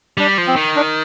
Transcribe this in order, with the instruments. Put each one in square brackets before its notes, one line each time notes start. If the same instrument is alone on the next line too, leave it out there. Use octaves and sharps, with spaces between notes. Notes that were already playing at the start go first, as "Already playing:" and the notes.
[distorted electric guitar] G3 [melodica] D4
[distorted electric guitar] F3
[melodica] C4
[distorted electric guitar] D#3
[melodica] D4